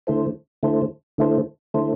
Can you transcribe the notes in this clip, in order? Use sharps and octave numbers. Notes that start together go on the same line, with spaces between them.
D3 A3 E4 A4 C5
D3 A3 E4 A4 C5
D3 A3 E4 A4 C5
D3 A3 E4 A4 C5